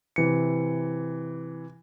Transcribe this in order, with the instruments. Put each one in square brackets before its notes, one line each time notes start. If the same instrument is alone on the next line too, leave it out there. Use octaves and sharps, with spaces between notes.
[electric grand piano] C3 E3 C#7